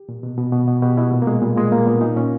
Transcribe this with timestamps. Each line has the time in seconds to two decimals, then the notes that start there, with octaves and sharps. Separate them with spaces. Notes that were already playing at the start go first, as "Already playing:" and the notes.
Already playing: G4
0.09 A#2
0.23 B2
0.38 B2
0.52 B2
0.68 B2
0.82 B2 G4
0.97 B2 E4
1.12 A#2
1.22 A#3
1.27 A#2 G#3
1.42 A#2 G3
1.57 A#2 G#3
1.72 A#2 A#3
1.86 A#2 B3
2.01 A#2 D#4
2.16 A#2 C#4